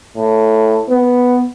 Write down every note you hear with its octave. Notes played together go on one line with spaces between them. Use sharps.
A2
B3